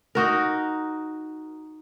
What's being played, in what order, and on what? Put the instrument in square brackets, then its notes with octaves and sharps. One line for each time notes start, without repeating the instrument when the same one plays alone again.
[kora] D#4 F#4 A#4